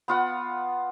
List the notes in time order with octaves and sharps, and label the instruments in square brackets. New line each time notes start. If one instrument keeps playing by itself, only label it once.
[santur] B3 F4 F#5